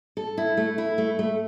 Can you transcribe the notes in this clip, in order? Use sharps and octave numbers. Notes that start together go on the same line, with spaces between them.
A4
E4
A3
E4
A3
A3